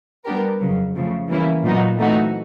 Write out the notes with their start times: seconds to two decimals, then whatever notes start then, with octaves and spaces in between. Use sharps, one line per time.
0.24 G3 B3 D4 G4 A#4
0.60 F2 C#3 F#3
0.95 C#3 F3 A3
1.29 E3 G3 A#3 C#4 E4
1.64 A#2 F#3 B3 D#4 F#4
1.99 E3 A3 C4 D#4 F#4